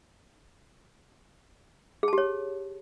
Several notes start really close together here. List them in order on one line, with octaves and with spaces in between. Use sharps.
G#4 A5 G4 C#5